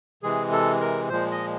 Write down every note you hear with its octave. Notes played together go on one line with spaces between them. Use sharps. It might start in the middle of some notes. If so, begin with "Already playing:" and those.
C3 E3 G#3 G#4
A4
A#4
A#2 F3 G#3 C5
D#5